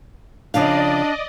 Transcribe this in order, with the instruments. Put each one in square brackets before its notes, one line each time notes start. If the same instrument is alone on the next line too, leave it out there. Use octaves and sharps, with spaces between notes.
[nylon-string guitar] C#3 F3 F5 [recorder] D4 [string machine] D5 D#5